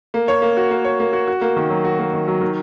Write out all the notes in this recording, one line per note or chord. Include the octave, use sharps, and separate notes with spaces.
A#3
C#5
A#3
F#4
A#3
C#5
A#3
F#4
F#4
A#3
D#3
F#3
F#4
A#3
D#3
F#3
D#3